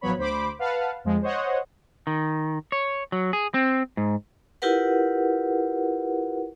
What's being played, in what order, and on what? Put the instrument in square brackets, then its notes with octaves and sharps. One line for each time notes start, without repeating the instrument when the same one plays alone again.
[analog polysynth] A1 F3 F#3 B3 C#5 B5
D2 C5 B5 D6
B4 F5 F#5 A5
F2 F3 G#3
C5 C#5 D#5 F#5
[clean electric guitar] D#3
C#5
F#3
G#4
C4
G#2
[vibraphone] E4 F4 G4 A#4 B4 F#5